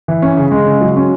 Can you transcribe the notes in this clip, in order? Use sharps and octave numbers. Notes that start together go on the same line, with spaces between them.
E3
C#4
C#3
G#3
C#3
F#3
C#4